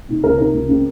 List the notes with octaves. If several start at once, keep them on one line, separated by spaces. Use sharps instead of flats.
C3 D#3
C#2 A#4
C3 D#3 A#4
C#2
C#3 G#3 C4